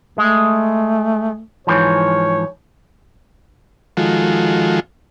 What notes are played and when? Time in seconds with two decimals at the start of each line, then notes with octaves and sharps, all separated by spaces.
0.18 G#3 A3
1.67 G#2 E3 F3 C#5
3.97 D#3 F3 G#3 F4 F#4 A4